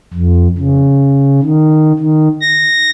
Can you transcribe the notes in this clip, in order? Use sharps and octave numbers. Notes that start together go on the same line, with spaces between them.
F2
C#3
D#3
D#3
A#6